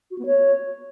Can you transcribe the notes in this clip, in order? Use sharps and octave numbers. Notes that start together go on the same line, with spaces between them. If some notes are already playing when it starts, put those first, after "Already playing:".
F#4
B3
C#5